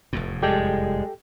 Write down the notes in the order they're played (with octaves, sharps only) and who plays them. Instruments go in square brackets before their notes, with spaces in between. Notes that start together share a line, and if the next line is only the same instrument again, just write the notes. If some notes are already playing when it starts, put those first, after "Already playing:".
[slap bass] F1 E2 A2
[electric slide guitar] G3 G#3 [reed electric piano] G4 A4 G5